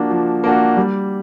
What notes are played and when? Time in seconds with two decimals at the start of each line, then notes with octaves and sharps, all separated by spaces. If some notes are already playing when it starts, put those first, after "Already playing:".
Already playing: F3 A#3 D4 F#4
0.11 F3
0.44 A#3 D4 F#4
0.77 G3